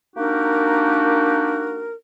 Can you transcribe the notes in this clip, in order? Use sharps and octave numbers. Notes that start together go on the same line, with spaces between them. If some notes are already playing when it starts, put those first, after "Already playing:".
A#3 D4 D#4 F#4 G4 A#4